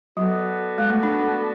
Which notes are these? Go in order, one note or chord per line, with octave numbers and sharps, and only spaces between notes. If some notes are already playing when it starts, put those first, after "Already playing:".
F#3 B3 F#4 A4 D5
G#3
A3
D4